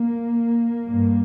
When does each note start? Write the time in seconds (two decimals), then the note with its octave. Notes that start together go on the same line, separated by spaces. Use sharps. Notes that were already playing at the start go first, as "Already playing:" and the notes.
Already playing: A#3
0.89 G2